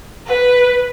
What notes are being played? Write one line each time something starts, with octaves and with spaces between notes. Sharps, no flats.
B4